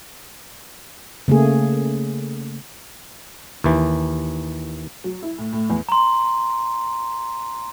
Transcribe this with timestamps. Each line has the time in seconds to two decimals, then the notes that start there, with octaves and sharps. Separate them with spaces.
1.28 C#3 A3 A#3 G#4
3.64 D#2 E3
5.04 F#3
5.22 E4
5.38 A2
5.53 A2
5.70 E2
5.89 A#5 C6